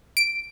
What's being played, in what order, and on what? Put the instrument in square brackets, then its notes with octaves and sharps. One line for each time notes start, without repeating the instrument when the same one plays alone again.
[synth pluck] D7